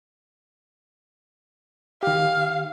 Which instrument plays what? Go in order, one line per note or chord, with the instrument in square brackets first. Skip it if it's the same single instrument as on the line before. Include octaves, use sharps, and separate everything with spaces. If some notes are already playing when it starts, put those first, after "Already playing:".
[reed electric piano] D#3 G4 [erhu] F5